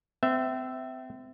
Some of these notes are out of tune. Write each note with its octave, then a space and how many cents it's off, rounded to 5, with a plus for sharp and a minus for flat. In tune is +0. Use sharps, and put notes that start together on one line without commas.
C4 -35 E5 +0